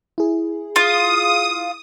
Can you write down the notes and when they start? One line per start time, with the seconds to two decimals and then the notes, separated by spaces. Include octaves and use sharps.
0.18 E4 G#4
0.76 F4 D#6